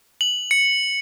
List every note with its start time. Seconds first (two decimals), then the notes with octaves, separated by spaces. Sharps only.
0.21 F#7
0.51 C#7